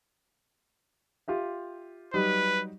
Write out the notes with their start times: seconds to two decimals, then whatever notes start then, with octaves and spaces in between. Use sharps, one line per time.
1.28 F4 G4 E5
2.14 F#3 G3 D#4 B4